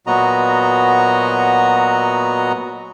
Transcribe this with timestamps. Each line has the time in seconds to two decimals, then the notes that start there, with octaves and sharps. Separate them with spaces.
0.07 A#2 F#3 B3 F#4 D#5 A#5